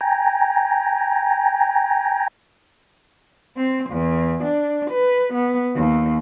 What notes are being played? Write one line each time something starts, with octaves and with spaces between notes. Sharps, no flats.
G5 G#5 A#5
C4
E2
D4
B4
B3
D#2